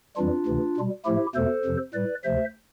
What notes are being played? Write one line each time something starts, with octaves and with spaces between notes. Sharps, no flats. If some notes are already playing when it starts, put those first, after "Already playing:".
F2 E3 G3 D4 F4
D2 C3 E3
B2 G3
A2 F3 A3 E4 G4
E2 B2 A3 A4 C5
F2 C3 F3
A2 G3 B4 D5
D2 C3 F3 C5 E5